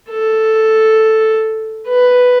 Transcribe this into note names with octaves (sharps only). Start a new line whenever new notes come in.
A4
B4